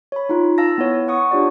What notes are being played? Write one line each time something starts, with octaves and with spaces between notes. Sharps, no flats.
C#5 B5
D#4 F4
F5 A5 E6 A#6
B3 E4 C#5
F#5 C#6 D#6
D4 F4 G4 C#5 D5